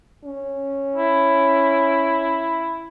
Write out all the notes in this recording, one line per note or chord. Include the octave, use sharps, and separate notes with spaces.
C#4
E4